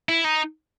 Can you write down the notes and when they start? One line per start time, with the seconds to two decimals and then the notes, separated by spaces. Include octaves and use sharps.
0.09 E4
0.25 D#4